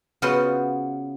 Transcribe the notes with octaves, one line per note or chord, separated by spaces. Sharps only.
C#3 B3 F4 F#4 C5 C6